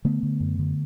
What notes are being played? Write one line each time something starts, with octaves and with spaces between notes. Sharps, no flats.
D3 A3 B3
D3
F#2
D3